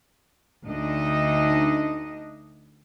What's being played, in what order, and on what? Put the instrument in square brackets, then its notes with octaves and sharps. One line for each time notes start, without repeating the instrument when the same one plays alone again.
[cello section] D2 D4 D#4 D#5